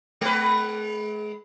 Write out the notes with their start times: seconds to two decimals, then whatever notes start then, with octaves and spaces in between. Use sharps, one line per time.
0.21 G#3 B4